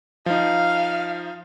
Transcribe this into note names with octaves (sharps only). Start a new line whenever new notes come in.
F3 D#4 F5